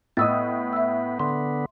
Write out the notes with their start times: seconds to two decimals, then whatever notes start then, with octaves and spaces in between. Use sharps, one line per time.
0.17 A2 B3 D#5 D#6 E6 A6
0.73 E5 E6
1.19 D3 B3 C6